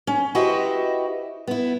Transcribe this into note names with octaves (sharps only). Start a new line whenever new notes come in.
C#4
E4 F#4 G4 B4 C5 D#5
B3 E4